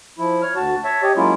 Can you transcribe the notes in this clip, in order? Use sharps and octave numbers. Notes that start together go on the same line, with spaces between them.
F3 E4
C#5 F6
D2 F#4 A5
C#5 E5 A5
G4 C#5 D#5
F#3 G#3 A#3 C#4 E4 F4